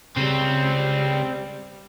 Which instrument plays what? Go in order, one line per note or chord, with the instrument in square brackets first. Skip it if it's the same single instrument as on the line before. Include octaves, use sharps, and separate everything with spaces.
[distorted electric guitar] C#2 C#3 [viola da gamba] G3 [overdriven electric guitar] C4